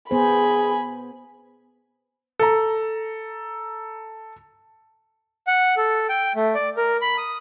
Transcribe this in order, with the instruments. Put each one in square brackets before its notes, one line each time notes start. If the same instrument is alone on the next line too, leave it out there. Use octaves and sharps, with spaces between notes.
[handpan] B3 C5 [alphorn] G#4 [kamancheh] G#5 B5
[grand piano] A4 A#5
[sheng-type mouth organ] F#5
A4
G5
A3
D5
A#4
B5
D#6